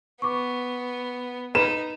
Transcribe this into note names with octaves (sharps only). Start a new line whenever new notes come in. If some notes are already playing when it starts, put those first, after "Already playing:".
B3 C#6 D6
D#4 B4 D#7 E7